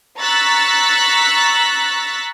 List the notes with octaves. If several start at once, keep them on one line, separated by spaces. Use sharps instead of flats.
A#5 C#6 E6 F#6 A6 B6